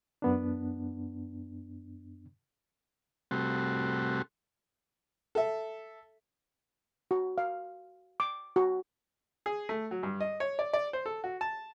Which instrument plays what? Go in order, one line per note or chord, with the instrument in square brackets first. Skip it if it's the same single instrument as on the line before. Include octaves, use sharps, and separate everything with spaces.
[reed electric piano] F#2 B3 D4
[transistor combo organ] C3 G3 A3 C4 F#4
[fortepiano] A4 E5
[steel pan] F#4
F5
D6
F#4
[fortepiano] G#4
A3
F#3
G2
D#5
C#5
D5
D5
C5
A4
F#4
A5